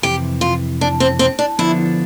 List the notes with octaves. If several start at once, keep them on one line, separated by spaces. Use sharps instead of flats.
F2 C3 E3 G4
F4
D4
C4
C4
D4
D3 F3 B3 D4 E4